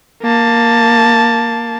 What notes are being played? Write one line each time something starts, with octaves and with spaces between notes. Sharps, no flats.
A#3 A5